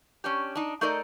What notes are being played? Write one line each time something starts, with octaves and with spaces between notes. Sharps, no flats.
C#4 D4 G4
D4 D#4
A3 D#4 A4 A#4 D5 D#5